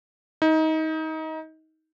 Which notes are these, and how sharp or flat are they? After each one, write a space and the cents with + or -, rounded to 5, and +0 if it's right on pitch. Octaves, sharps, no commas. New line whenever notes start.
D#4 +25